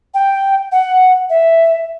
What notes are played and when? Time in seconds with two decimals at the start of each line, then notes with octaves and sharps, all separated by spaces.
0.14 G5
0.72 F#5
1.30 E5